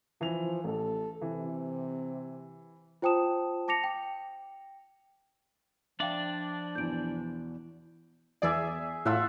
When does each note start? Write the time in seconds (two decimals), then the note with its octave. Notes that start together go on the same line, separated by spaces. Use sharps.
0.21 E3 F3 F7
0.64 A1 A4
1.21 C3 E3
3.02 F4 C5 G5 A5 D#6 E7
3.68 A5 D6 A#6 C#7 F7
3.84 G5
6.00 F3 D4 D5 E5 F5 G5
6.75 E2 B2 E3 G6 D7
8.42 E2 G#4 D5 E5
9.05 A2 F4 E5 F#5